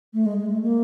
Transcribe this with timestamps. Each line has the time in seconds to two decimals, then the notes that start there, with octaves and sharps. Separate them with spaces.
0.14 A3
0.26 G#3
0.38 G#3
0.50 A3
0.62 A#3